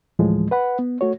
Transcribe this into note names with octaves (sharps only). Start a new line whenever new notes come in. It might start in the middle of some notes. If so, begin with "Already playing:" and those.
D2 A2 E3 F3 G#3
B4 F#5 B5
B3
A3 F#4 C#5